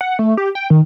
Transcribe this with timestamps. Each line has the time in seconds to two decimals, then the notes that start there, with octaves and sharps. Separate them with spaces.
0.01 F#5
0.19 A3
0.37 G4
0.55 G5
0.70 D#3